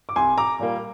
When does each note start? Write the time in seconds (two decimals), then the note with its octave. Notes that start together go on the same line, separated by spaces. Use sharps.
0.09 D6
0.16 C2 G#5 C6
0.38 A#5 D6
0.59 A#2 G3 A#3